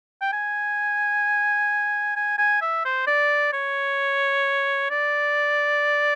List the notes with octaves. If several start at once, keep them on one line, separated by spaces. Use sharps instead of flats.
G5
G#5
G#5
G#5
E5
C5
D5
C#5
D5